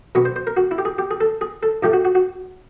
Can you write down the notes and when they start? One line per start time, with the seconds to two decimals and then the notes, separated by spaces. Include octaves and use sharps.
0.15 B2 F#3 B3 C#5
0.25 C5
0.36 C5
0.47 A#4
0.57 F#4
0.71 E4
0.78 G4
0.85 G#4
0.98 G4
1.11 G#4
1.21 A4
1.41 G#4
1.63 A4
1.83 G#2 F3 A3 G4
1.93 F#4
2.05 F#4
2.15 F#4